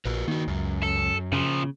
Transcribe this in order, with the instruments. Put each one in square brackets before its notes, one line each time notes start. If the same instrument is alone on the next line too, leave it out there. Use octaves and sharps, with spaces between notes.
[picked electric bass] A#1 [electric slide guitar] F#4 A#4 B4
[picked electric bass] D#3 [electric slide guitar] A#3 F#4
[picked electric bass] C#2 [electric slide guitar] F#2
[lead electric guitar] A4
[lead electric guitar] A#2 F3 [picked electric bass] C#3